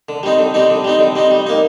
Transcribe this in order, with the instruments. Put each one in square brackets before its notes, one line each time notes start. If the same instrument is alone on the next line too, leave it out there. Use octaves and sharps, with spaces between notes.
[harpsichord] D3
G3 C4 D#4
D3
G3 C4 D#4
D3
G3 C4 D#4
D3
G3 C4 D#4
G3
A#3 D#4